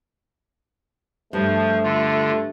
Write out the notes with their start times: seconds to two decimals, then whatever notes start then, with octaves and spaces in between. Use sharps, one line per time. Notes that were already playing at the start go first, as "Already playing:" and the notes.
1.33 G2 F3 A3
1.83 D3 F4